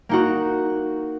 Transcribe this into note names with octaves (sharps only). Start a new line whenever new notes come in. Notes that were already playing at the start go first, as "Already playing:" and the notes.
A#3 D#4 F#4